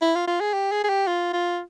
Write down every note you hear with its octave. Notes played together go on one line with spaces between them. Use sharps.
E4
F4
F4
G#4
G4
G#4
G#4
G4
F4
F4